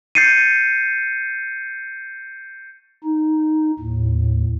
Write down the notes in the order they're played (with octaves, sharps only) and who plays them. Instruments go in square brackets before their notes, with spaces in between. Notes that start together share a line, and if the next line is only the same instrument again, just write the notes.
[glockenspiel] G6 A6 C7 C#7 D#7
[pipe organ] D#4
D#2 A2